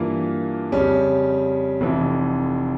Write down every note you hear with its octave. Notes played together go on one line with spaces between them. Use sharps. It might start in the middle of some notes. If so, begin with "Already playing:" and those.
Already playing: G2 E3 A#3 F4
F2 C#3 G3 C#4
F1 F2 E3